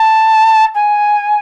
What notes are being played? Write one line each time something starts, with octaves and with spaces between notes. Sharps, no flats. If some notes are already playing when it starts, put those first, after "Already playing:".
Already playing: A5
G#5